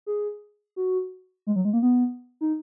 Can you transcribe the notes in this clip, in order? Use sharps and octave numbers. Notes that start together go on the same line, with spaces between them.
G#4
F#4
G#3
F#3
G#3
A#3
B3
D#4